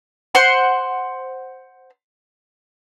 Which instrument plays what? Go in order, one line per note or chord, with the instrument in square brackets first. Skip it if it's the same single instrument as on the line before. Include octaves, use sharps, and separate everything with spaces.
[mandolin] C5 F#5 C6